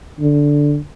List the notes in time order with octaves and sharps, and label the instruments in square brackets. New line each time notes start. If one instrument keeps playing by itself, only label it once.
[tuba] D3